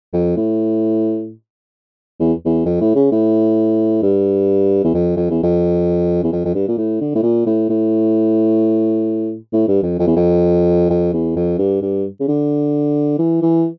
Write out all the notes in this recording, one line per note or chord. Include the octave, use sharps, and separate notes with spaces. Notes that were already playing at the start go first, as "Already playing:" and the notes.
F2
A2
E2
E2
F2
A2
C#3
A2
G2
E2
F2
F2
E2
F2
E2
F2
F2
G2
A#2
A2
D3
A2
A#2
A2
A2
A2
G2
F2
F2
E2
F2
F2
E2
F2
G2
G2
C#3
D3
E3
E3